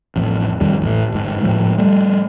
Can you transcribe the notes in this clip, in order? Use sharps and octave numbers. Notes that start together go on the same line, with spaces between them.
A1 F2 A2
F2 D#3 G3
A1 A2
G1 G#2
A2 F3 G#3
G3 A3